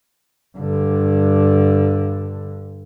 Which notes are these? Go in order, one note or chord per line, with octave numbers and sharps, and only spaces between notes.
G2 D3